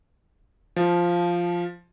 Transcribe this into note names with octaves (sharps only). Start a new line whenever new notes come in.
F3